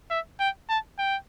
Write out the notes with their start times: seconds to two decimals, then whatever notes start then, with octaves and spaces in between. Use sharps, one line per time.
0.11 E5
0.40 G5
0.69 A5
0.99 G5